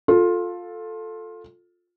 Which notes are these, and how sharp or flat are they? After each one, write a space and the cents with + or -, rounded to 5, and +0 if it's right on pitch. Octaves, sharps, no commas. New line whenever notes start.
F4 +15 A4 +0